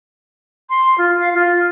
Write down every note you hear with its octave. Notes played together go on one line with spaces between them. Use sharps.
C6
F4
F5
F4